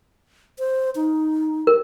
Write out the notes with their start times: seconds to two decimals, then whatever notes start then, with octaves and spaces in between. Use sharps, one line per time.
0.59 C5
0.96 D#4
1.67 A#4